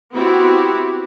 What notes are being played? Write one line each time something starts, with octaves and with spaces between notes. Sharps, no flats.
B3 C4 E4 F#4 G4